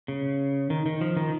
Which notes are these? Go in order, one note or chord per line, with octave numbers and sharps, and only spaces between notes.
C#3
D#3
D#3
F3
D#3